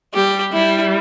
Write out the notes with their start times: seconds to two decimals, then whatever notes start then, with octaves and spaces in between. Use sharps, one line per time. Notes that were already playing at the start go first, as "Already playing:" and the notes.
0.14 G3 G4
0.53 G3 E4